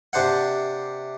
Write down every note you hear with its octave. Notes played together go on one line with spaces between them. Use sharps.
C3 D4 C5 F#5